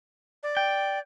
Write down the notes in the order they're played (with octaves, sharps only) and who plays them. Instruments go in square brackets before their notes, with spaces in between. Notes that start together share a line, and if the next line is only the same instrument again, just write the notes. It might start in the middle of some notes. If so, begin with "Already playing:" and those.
[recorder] D5
[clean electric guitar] G5